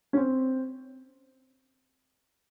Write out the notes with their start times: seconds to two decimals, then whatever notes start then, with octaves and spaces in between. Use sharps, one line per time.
0.13 C#4
0.17 C4